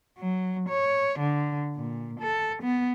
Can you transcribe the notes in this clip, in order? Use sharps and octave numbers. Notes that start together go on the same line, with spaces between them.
F#3
C#5
D3
A#2
A4
B3